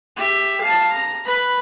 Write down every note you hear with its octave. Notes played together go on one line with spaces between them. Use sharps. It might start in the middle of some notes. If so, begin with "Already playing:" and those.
G4 E5
F5 A5
A#5
B4 B5